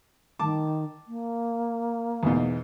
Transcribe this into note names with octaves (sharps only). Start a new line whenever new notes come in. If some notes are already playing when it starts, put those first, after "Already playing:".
D#3 A5 D6
A#3
E2 G#2 B2